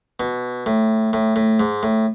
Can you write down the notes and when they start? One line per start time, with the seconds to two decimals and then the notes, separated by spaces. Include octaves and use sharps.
0.20 B2
0.66 A2
1.13 A2
1.36 A2
1.60 G#2
1.83 A2